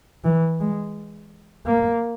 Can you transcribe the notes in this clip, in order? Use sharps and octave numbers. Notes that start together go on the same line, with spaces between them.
E3
G#3
A#3